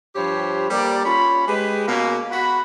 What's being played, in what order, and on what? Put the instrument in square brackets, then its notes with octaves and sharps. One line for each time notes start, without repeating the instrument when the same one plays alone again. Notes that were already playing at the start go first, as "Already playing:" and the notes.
[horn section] G2 F3 G4 C5 C#5 B5
G3 A#3 A4 D5
C#4 F4 C#5 B5
G#3 G4 B4
B2 A#3 C#4
F#4 B5